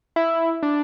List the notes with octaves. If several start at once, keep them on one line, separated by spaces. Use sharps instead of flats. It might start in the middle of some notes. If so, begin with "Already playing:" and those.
E4
D4